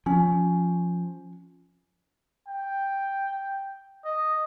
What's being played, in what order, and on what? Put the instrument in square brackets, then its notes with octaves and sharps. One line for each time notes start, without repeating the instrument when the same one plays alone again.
[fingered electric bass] F3 [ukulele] C#4
[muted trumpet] G5
D#5